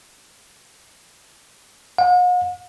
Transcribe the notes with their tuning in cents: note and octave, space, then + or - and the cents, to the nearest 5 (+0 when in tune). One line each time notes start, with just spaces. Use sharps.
F#5 -45